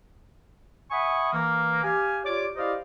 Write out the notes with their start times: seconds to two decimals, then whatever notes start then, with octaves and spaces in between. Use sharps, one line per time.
0.91 E5 F#5 G#5 B5 C#6 D#6
1.33 E3 A#3
1.83 G4 F5 G#5
2.24 F4 G4 C#5 D5 D6
2.57 E4 G4 C5 D5 D#5 F5